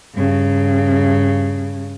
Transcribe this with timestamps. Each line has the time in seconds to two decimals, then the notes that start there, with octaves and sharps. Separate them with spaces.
0.14 G2 C#3